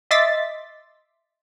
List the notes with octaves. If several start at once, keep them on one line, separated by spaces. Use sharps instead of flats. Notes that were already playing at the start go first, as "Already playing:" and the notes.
D#5 E5 C6 D6 A6 B6